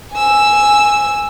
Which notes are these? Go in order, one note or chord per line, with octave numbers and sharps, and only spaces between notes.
G#5 E6